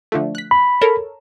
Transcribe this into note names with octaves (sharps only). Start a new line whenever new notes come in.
D3 F3 A3
F#6 B6
B5
A4 A#4 C#5